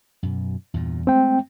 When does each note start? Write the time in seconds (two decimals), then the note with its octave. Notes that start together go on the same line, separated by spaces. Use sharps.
0.23 F#2 B2
0.74 E2 G2 A#2
1.07 G#3 A3 C4 G5